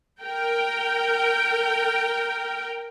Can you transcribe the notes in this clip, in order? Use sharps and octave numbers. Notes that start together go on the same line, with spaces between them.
A#4 G5